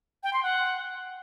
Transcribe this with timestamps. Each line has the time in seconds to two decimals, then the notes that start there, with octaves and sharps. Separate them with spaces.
0.23 G5
0.33 C6
0.43 F#5